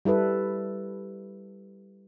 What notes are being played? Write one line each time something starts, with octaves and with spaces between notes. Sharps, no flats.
G3 E4 A4 B4